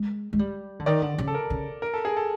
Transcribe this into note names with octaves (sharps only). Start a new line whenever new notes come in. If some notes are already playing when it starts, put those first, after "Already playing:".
Already playing: G#3
G#3
G3
D3
D#3 D5
D3
C#3
A4
A#4
C#3
A#4
A4
G#4
A4